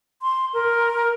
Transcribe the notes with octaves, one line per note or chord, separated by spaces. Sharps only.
C6
A#4